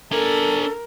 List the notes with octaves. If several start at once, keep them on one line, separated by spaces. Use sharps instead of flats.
D4 A4 A#4 G#5